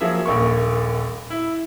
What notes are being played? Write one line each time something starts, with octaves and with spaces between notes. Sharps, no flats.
F3 F#3 A#3 G#4 E5
D#1 A#1 A#3 C#6
E4